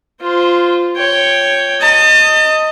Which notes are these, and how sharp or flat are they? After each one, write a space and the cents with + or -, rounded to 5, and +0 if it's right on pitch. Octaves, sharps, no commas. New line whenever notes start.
F4 +0 C5 -15
C#5 +0 G5 +0
D#5 +0 A5 +35